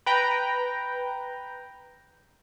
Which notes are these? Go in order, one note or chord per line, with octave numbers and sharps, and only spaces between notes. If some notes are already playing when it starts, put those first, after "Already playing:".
B4 G5 A#5